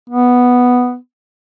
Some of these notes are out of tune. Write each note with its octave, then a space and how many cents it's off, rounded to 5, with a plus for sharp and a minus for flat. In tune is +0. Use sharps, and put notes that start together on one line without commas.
B3 +0